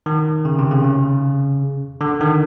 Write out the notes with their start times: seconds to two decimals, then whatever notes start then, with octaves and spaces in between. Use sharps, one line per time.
0.06 D#3
0.45 C#3
0.59 C3
0.71 C#3
0.84 C#3
2.01 D3
2.20 D#3